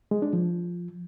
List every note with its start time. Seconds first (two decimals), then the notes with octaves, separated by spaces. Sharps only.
0.11 G#3
0.22 D4
0.33 F3